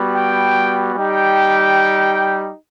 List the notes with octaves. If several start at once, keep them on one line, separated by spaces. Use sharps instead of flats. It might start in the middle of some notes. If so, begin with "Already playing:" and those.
Already playing: G3 B3 F#4
G5
G3 D#4 G4 G5